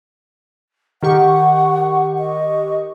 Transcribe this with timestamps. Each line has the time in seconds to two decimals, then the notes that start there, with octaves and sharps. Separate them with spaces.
1.03 D#3 G4 F#5 C#6
2.19 D#5